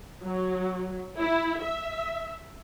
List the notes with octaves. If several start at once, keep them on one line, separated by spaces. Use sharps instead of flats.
F#3
E4
E5